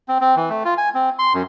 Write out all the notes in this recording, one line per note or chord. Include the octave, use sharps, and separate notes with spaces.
C4
C4
E3
A3
F4
G#5
C4
C6
F#2